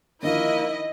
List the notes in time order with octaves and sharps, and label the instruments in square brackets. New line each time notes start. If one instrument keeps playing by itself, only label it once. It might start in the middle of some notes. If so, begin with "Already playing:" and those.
[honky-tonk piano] D3 D#3 F3 [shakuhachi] A#3 [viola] E4 [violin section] D#5